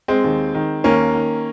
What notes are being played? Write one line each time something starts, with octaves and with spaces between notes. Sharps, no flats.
G#3 C4
D#2
D#3
D#2 A#3 C#4
D#3